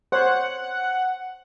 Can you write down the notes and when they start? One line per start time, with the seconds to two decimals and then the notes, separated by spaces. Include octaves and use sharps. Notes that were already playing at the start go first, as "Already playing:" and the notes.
0.12 C5 C#5 F#5